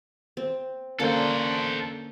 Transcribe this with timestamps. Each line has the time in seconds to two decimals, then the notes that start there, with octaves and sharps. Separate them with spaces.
0.37 C4
1.00 D3 A#3 C#4 A4 C5